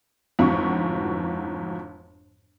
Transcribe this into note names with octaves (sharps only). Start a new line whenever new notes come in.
G1 F2 G#2 E3 F#4 C#6